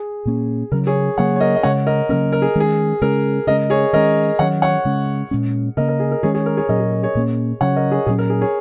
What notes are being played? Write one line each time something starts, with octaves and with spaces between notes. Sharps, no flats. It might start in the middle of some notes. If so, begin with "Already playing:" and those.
Already playing: G#4
A#2 A#3 C#4
C#3 F#3 C#4 A#4
G#4 C#5
C#3 F#3 A#3 C#5 F#5
C#5
A#4 D#5
D#5
C#3 G#3 C#4 C#5 F#5
A#4 D#5
C#3 F#3 A#3 C#4 A#4
A#4
G#4
D#3 G#3 C#4 G#4
C#3 G#3 C#4 A#4
C#3 G#3 C#4 A#4 D#5
G#4 C#5
D#3 G#3 C#4 A#4 D#5
D#3 F#3 C#4 C#5 F#5
C#5 F#5
C#3 G#3 C#4
A#2 G#3 C#4
C#3 A#3 C#4 A#4 D#5
A#4
G#4
A#4
D#3 G#3 C#4 G#4 C#5
G#4 C#5
A#4
G#4 C#5
A#2 F#3 C#4 A#4 D#5
G#4
A#4
G#4 C#5
A#2 A#3 C#4
C#3 F#3 C#4 C#5 F#5
A#4 D#5
G#4 C#5
A#2 F#3 C#4 G#4
A#4
G#4
G#4 C#5